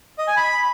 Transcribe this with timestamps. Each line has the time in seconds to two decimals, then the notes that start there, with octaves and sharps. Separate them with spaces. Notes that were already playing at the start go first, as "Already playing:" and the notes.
0.18 D#5
0.28 G#5
0.37 B5